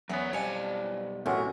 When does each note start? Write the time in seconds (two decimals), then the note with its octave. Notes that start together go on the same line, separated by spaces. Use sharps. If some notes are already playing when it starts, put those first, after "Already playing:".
0.09 E2 F#3 B3 C#4 A#4 C#5
0.33 B1 F2 G3 C#5 D5 G#5
1.26 A1 F#2 C3 A3 C#4 F#4 A#4